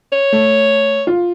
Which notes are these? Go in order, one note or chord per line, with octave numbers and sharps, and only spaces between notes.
C#5
A3
F4